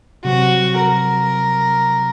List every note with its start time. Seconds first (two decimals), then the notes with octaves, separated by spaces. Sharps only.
0.25 C3 F#3 C4 F#4
0.79 A#4